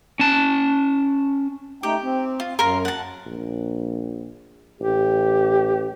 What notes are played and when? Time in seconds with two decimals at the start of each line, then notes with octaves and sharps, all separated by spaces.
0.19 C#4 A5
1.83 A3 D#4 G4 G5
2.03 C4
2.40 F4
2.59 F#2 A#4 F5 C6
2.85 F#5 A5
3.26 A#1
4.81 A1 G4